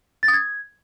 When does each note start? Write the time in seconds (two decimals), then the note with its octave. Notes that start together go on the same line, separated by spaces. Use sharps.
0.23 A6
0.28 D#6
0.34 G#6